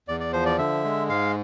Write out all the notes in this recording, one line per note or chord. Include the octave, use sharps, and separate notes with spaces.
E2 D5
D5
F3 C5
D5
D3 E5
G#3
G#2 F5